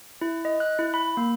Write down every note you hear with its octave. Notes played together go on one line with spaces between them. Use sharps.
E4
D#5
F#6
E4
B5
A#3